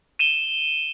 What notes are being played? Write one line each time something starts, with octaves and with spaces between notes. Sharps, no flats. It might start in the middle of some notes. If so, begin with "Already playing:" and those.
D#7 E7 G7